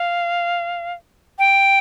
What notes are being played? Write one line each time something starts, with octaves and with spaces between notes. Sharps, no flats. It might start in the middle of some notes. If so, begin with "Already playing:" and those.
Already playing: F5
G5